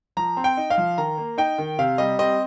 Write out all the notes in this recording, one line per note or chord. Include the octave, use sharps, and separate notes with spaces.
F3 A#5
C4
G5
D#4
F5
F3
D#3 A#5
A#3
D#4 G5
D#3
C3 F5
G3 D#5
C4 D#5